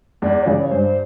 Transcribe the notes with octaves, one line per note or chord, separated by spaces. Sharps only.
E2 D5
C#5
C#3 E3 D5
C#5
G2 C5